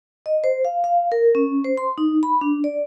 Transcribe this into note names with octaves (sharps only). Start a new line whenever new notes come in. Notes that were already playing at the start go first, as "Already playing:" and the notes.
D#5
C5
F5
F5
A#4
C#4
C5
C6
D#4
B5
D4
D5